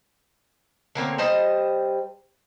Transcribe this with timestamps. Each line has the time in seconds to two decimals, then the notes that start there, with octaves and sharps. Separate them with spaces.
0.95 D3 A#3 C4 C#5
1.18 G3 C5 D#5 A5